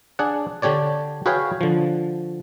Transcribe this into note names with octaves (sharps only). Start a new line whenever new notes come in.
D4 G#4 D5 F#5
D3 D4 G4 C#5 D5
F#4 G#4 B4 C#5 F5 G5
D3 F3